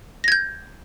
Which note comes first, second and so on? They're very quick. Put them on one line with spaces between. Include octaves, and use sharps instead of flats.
A#6 G#6 G6